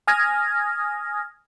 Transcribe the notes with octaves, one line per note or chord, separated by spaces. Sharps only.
G#5 D#6 F6 G#6 A#6